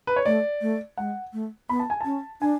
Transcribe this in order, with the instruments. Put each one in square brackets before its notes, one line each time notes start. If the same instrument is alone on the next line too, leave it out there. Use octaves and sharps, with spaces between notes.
[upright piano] B4
C#5
[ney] A3 [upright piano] D5
[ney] A3
[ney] G#3 [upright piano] F#5
[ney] A3
[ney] B3 [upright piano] B5
[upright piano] A5
G#5
[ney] C#4 [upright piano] A5
[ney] D4 [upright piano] G#5